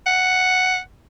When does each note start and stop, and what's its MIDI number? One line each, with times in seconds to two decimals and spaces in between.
0.06 0.77 78